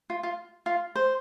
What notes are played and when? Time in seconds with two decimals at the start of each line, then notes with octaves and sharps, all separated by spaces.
0.10 F4
0.23 F4
0.66 F4
0.95 C5